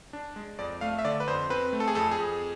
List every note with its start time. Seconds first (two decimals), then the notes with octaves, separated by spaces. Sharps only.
0.13 D4
0.36 G#3
0.59 F2 D5
0.81 A3 F5
0.99 E5
1.05 D3 D5
1.20 B4
1.27 F2 C5
1.50 C4 B4
1.73 A3
1.80 A4
1.88 G#4
1.95 F2 A4
2.11 G#4
2.19 F2